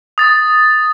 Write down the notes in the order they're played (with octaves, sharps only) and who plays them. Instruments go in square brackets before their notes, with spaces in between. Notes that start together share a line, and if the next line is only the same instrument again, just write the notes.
[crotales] D#6 A6